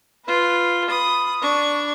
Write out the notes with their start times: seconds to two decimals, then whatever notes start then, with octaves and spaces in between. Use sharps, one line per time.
0.25 F4 B4
0.89 B5 D#6
1.41 D4 C#6